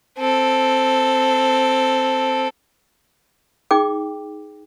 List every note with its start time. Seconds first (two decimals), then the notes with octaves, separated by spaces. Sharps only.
0.18 C4 A4
3.71 D#4 G#4 G5 D6